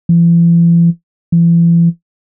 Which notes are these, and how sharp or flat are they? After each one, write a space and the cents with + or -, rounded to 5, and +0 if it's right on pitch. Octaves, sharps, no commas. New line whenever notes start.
E3 +45
E3 +40